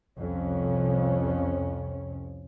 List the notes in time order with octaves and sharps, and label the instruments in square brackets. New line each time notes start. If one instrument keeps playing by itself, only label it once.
[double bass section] C2 F2 C#4